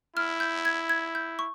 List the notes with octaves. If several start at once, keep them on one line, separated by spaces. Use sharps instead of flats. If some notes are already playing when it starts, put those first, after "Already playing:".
E4 F6
G6
G#6
G#6
G6
C#6